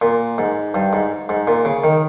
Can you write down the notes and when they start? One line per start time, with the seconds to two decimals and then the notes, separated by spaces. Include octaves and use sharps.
0.02 A#2
0.38 G#2
0.74 G2
0.93 G#2
1.29 G#2
1.47 A#2
1.65 C#3
1.84 D#3